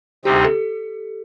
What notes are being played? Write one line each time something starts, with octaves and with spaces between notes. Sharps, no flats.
D2 C3 G3 C4 D#4 G4
G4
A4